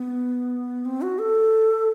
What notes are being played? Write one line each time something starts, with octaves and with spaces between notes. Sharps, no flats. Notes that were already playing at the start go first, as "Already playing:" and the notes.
Already playing: B3
C4
F#4
A4